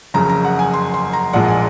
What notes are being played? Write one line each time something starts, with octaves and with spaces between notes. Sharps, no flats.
F#1 F2 C#3 A#5
A#5
F#5
G#5
C6
C6
A#5
A#1 A#2 G#3 F#5
G#5